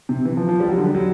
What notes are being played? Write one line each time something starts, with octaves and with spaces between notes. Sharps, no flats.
C3
E3
F3
F3
G3
F#3
D3
G3
F#3